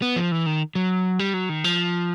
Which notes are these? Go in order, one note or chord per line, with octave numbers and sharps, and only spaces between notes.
B3
F3
E3
D#3
F#3
G3
F#3
D#3
F3